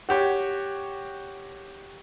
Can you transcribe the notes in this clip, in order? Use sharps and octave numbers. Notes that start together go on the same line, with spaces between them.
F#4 G4 C#5